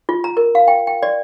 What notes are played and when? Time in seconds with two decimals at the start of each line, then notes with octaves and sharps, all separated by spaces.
0.09 F4
0.24 A#5
0.37 A#4
0.55 F5
0.68 G5
0.87 G5
1.03 D5